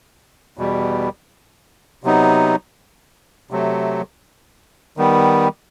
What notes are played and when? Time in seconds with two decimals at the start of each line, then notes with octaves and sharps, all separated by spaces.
0.57 E2 B2 G3
2.04 C3 F#3 B3 D#4
3.51 C3 F#3 A3
4.97 D#3 G3 B3